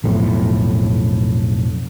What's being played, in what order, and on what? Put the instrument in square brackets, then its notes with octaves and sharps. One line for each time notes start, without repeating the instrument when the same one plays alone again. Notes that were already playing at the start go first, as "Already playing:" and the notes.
[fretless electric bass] B1 F2 A2